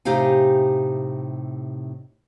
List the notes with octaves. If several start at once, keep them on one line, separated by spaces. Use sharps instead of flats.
A2 C3 D#4 G4 F5 G#5